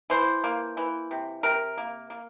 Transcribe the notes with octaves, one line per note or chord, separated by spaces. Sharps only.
E3 C5
A#3
E3
C3
C3 A#4
A#3
A#3